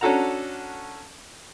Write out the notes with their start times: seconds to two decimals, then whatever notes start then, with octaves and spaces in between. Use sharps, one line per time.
0.01 C#4 D4 F#4 A4 F#5 A#5